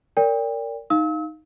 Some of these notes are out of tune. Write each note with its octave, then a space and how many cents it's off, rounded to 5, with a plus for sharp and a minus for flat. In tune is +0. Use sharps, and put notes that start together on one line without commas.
A#4 -20 D5 -30 G5 +30
D#4 +0 F5 +0 E6 -40